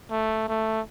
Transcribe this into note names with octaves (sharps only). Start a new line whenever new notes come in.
A3
A3